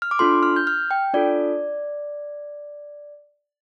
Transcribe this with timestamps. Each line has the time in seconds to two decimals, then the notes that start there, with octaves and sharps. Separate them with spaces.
0.02 F6
0.11 D6
0.19 D4 F4 A4 C6
0.43 F6
0.56 G6
0.67 F6
0.91 G5
1.14 D4 F4 A4 D5